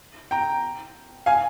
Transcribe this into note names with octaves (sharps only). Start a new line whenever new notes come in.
G5 A#5
F5 G#5